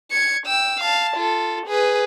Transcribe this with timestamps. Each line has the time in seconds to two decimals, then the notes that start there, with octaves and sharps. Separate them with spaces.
0.11 G#6 C#7
0.47 G5 E6
0.80 F5 A5
1.17 F4 A4
1.67 G#4 B4